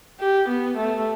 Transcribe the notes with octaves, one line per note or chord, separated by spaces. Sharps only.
G4
B3
A3